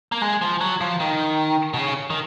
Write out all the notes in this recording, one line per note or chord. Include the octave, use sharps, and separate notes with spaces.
A#3
G#3
F3
F#3
F3
D#3
B2
C#3
D#3